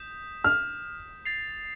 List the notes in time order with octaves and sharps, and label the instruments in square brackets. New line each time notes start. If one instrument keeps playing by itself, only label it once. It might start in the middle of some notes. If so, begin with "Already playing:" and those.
Already playing: [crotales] D#6 G6 B6 E7
[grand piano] F6
[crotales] A6 C7 F7